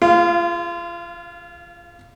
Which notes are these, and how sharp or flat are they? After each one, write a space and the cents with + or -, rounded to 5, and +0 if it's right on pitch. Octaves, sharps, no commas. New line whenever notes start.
F4 -30 G#4 +0 F5 +0